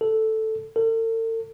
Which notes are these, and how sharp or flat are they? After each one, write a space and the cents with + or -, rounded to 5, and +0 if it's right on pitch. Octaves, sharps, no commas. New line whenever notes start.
A4 +0
A4 +45